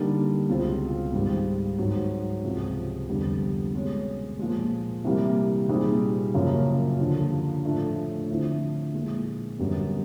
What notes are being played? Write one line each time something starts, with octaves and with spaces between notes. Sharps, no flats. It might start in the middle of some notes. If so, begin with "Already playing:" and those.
Already playing: D3 G3 A#3 D#4
C#2 B2 G#3 C4 F4
G#2 D#3 G3
G#2 D#3 F#3
C#2 C3 F3 G#3
F2 D3 G3 B3
B2 G#3 C#4
A#2 F3 G#3
C3 E3 G3 A#3
A#2 G3 C4 D#4 G#4
F#2 C#3 F3 A#3
D#2 D3 F3
A2 F3 A3 D4
D3 F3 A3 C4 E4
A#2 F3 G#3
F#2 D3 G3 B3